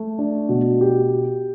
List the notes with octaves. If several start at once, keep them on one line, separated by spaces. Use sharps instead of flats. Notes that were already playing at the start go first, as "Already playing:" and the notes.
Already playing: A3
D4
B2
G4